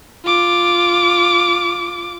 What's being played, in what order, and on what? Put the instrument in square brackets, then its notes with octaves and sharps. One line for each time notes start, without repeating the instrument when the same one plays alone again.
[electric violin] F4 D6